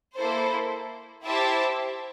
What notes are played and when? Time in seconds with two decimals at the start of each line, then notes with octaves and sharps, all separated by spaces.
0.15 A#3 E4 A4 C5
1.25 E4 G4 C5 E5 A5